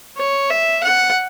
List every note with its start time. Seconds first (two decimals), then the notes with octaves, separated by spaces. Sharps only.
0.17 C#5
0.50 E5
0.84 F#5